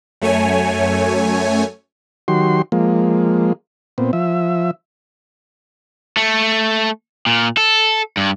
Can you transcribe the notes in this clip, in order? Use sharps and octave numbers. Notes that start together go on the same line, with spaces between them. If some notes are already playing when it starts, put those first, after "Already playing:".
F#2 A3 C#5 G#5
D#3 F#3 F#4 G4 C6
F3 G#3 A#3
A#2 B3 C4
F3 E5
A3
A#2
A4
G2